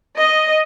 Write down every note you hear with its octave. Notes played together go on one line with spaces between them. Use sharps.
D#5